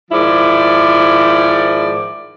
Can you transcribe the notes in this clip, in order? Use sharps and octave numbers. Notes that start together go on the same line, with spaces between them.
G#2 D#3 F3 E4 D5